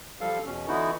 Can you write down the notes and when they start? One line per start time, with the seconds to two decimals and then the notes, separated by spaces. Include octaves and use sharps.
0.21 F3 G3 A4 F5
0.46 E2 B2 C#4
0.68 D3 E3 B3 D#4 E4 F#4